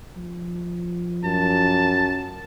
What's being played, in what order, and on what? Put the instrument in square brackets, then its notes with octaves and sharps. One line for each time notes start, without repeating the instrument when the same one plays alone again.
[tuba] F3
[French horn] F#2 [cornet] A5